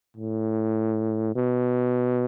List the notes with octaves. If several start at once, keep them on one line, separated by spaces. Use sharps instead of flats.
A2
B2